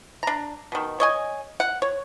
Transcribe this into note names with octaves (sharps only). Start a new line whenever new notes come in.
D4 A#5
B2 D#3
C#5 D#5 G#5
F#5
C#5